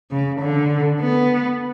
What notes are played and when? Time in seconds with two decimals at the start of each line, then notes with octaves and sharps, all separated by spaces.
0.11 C#3
0.41 D3
1.00 B3